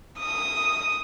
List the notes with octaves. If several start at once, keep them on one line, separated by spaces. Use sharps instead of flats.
D#6